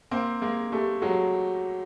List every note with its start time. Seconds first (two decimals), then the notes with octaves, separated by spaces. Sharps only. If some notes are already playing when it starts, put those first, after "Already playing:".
0.11 A#3 C4
0.42 G#3 A#3
0.72 G3 A3
1.02 F#3 G#3